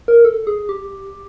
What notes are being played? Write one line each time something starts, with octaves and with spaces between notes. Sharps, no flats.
A#4
A4
G#4
G4